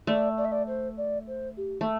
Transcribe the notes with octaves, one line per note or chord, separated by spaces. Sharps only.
A3 D5
D5
E5
D5
C5
D5
C5
G4
A3